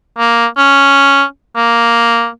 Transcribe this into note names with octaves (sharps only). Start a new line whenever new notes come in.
A#3
C#4
A#3